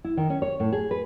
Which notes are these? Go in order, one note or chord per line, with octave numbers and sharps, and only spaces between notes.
E4
D#3
C#4
C#5
A2
G#4
B4